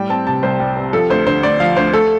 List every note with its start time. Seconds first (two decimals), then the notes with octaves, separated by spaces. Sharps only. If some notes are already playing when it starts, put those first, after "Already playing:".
Already playing: A2 G3 G5
0.10 C4 A5
0.26 C3 A5
0.43 C2 C5
0.59 G3
0.77 C4
0.93 F3 A4
1.10 D2 C5
1.26 D3 C5
1.43 D2 D5
1.60 F3 F5
1.77 D2 C5
1.93 A3 A4